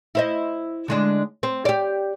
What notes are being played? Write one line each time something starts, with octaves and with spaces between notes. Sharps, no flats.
E4 C5 D#5
D3 G#3 D4
C4
G4 D5